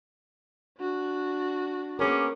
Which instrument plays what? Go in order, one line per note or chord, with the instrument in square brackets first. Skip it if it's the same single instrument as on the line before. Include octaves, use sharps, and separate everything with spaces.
[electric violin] D4 F#4
[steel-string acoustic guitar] A#3 G#4 A#4 [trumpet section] B3 C#4 D6